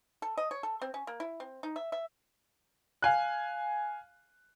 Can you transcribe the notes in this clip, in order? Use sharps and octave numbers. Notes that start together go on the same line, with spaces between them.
A4
D#5
C#5
A4
C4
C#4
A#3
E4
C4
D#4
E5
E5
F5 G#5 F#6